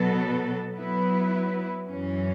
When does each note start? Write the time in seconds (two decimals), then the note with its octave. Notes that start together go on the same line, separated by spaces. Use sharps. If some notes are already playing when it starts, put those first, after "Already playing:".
Already playing: B2 F#3 B3 A4
0.76 F#3 B3 E4 B4
1.89 F#2 E3 C#4